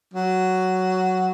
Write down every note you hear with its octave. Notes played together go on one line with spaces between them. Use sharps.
F#3